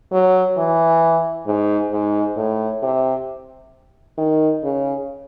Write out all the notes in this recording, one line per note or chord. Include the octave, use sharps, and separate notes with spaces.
F#3
E3
G#2
G#2
A2
C3
D#3
C#3